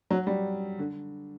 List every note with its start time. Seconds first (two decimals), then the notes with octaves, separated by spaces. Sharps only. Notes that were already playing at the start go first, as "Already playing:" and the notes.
0.11 F#3
0.27 G3
0.79 D3